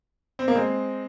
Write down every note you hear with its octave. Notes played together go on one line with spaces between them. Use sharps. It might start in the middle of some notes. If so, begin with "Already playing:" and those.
C4
A#3
G#3 C4